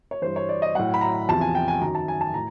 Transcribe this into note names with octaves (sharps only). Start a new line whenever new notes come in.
C#5
G2 E3 C5
C#5
D5
D#5
A2 F#3 F#5
B5
A#5
E2 C3 F3 A5
G#5
G5
G#5
F#2 D#3 F#3 A#5
A5
G#5
A5
A2 A#5